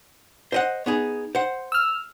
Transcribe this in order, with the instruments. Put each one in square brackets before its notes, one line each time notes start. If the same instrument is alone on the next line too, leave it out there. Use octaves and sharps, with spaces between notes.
[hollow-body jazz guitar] C5 D#5 F#5
B3 D#4 G#4
C5 F#5
[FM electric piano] E6 F6